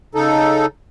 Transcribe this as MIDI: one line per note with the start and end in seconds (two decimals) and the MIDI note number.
0.15 0.66 49
0.15 0.66 63
0.15 0.66 69